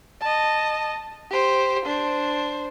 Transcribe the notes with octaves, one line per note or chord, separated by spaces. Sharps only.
D#5 A5
G4 C5
D4 C5